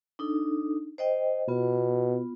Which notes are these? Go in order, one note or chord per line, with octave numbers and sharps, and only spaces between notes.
D4 D#4 A4
C5 D#5 G5
B2 B3 F4